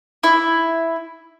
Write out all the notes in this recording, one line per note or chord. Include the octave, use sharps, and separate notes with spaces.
E4